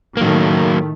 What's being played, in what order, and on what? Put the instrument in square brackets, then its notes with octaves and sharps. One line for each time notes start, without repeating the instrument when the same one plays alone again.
[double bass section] A2 D#3 A3 [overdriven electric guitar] F#3 A#3